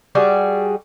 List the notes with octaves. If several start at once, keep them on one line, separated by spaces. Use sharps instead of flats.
G3 F#4 G#4